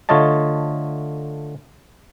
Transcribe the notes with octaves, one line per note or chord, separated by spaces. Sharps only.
D3 A3 F4 C#5 D#5 A5